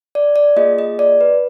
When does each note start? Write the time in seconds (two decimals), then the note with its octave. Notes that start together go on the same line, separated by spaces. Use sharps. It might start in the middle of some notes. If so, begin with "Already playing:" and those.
0.15 D5
0.36 D5
0.56 A#3 F4 G#4 D#5
0.79 D#5
0.99 D5
1.21 B4